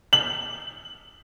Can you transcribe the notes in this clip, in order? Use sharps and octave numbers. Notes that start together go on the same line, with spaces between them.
F#7